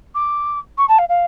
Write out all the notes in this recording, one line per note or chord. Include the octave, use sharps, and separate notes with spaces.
D6
C#6
A5
F5
F5